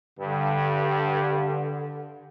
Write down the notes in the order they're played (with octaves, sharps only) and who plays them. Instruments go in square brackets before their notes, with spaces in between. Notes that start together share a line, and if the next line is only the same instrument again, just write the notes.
[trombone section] G2 [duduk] D3